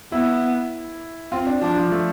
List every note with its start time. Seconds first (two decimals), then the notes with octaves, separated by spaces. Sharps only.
0.12 B3 E4
1.32 C4 F4
1.47 D4
1.61 F3 D4
1.77 F3
1.92 A3